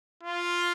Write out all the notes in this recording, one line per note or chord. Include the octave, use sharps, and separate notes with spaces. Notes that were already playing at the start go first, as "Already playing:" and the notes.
F4